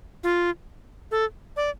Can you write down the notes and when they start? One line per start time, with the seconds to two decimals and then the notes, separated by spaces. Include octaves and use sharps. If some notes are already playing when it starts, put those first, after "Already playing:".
0.24 F4
1.11 A4
1.57 D5